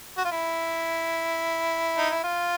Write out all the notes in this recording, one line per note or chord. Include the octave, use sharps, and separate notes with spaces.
F#4
F4
E4
D#4
E4
F4